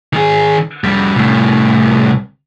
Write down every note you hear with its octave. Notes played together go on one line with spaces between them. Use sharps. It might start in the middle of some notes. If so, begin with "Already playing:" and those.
D#3 G#4
F2 G3
C2 A2